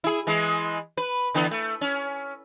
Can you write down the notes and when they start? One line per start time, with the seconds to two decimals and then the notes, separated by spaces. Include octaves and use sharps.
0.04 E4 G#4
0.27 E3 G#3
0.97 B4
1.34 D3 E3 B3
1.51 A3
1.81 C#4